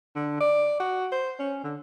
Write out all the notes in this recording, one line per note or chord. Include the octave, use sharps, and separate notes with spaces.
D3
D5
F#4
C5
C#4
D3